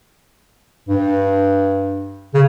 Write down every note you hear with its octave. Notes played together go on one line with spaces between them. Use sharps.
G2
C#3